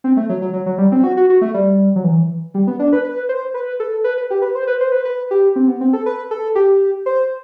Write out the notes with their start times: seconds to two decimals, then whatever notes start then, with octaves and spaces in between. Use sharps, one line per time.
0.04 C4
0.17 A3
0.29 F#3
0.42 F#3
0.53 F#3
0.66 F#3
0.78 G3
0.92 C4
1.04 F#4
1.17 F#4
1.30 F#4
1.41 A3
1.54 G3
1.96 F#3
2.04 E3
2.54 G3
2.67 B3
2.79 D4
2.92 B4
3.04 B4
3.29 C5
3.54 B4
3.80 A4
4.04 B4
4.18 B4
4.30 G4
4.42 B4
4.55 C5
4.67 B4
4.81 C5
4.92 B4
5.05 B4
5.31 G4
5.56 C4
5.68 B3
5.81 C4
5.93 A4
6.06 B4
6.31 A4
6.55 G4
7.06 C5